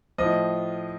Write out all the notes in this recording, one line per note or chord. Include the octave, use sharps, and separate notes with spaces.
A2 F3 D#5